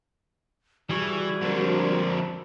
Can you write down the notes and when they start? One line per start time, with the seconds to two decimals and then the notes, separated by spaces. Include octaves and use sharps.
0.90 E3 G3 F#4 G#4 C#6
1.42 F2 D3 D4 A#4 C5